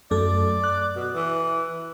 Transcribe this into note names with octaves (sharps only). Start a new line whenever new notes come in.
F#2 A3 A4 D5
F#6
B2
E3